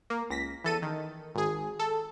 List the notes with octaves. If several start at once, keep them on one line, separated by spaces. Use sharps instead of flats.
A#3
C#2 A#6 B6
E2 A4 D#7
D#3
G#1 G#4
A4